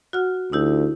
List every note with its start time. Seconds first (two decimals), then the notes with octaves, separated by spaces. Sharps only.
0.13 F#4 F#5 F6
0.52 D2 D#4 E4 G4